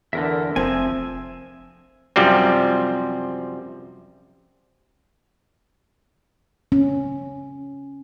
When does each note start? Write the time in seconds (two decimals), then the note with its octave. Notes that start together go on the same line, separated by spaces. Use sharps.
0.13 E2 D3 A4 A#4 E5
0.56 F1 F3 C4 E5 G#5
2.16 F#2 C3 F3 G3 C4
6.72 C#4